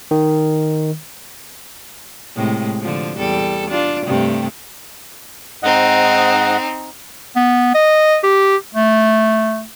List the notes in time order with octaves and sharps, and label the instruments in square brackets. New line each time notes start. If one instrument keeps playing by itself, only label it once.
[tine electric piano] D#3
[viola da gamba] A2 C3 G#3
D3 F3
E2 G3 A4
D4 F4
G2 C3 A3
[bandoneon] G#2 D#5 F#5 [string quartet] C4 D#4
[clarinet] B3
D#5
G4
A3